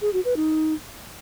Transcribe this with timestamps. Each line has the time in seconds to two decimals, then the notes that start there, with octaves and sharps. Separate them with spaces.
0.02 G#4
0.13 F#4
0.25 B4
0.36 D#4